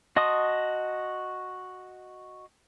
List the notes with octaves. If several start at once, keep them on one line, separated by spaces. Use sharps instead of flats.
F#4 D#5 A5 C6 D#6